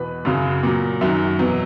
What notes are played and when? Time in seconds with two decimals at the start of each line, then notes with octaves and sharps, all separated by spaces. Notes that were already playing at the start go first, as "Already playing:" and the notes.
Already playing: E2 B2 B4 B5
0.25 F#2 C#3 F#3
0.63 A#2 F#3
1.01 F#2 D#3 F#3 E5
1.39 E2 B2 F#3